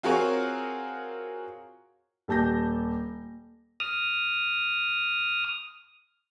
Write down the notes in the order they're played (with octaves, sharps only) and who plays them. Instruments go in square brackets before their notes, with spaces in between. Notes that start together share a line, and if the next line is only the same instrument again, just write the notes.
[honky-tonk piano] C4 F4 F#4 G#4 A#4 C#5
[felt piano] D#1 G4 A5 G6 A#6
[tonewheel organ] D#6 F6